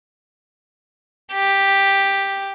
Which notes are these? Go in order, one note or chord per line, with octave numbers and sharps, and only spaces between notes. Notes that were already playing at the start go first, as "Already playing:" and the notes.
G4